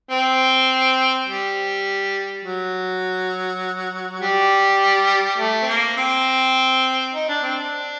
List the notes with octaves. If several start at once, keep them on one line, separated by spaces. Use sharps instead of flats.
C4
G3
F#3
G3
A3
C4
A#3
C4
D#4
D4
C4
D4